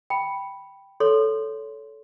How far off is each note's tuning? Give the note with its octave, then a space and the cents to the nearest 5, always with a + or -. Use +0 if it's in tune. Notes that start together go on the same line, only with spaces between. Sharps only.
G5 +0 B5 -5
A4 -5 C#5 +20 C6 +0